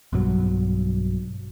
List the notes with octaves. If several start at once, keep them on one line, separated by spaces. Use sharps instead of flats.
B1 G2 F#3